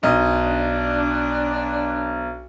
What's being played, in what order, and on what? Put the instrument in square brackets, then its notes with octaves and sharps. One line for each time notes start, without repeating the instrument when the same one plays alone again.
[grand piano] B1 D#5 [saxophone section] D4